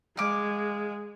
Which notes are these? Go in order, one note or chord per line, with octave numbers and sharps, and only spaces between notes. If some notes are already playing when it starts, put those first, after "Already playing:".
G#3 F5 D6